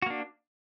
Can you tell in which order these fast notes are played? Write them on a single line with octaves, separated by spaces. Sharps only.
F#4 A#3 D4